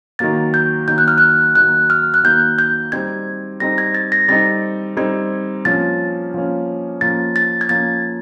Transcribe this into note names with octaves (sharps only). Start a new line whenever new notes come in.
D#3 F#3 A#3 A6
G6
D#3 F#3 A#3 G6
F#6
F6
F#6
D#3 F#3 A#3 F#6
F6
F#6
D#3 F#3 A#3 G6
G6
G3 C4 D#4 G#6
G3 C4 D#4 A#6
G#6
A6
A#6
G3 C4 D#4 A6
G3 C4 D#4 G#6
F3 A#3 C#4 A6
F3 A#3 C#4
F3 A#3 C#4 A6
A6
G#6
F3 A#3 C#4 A6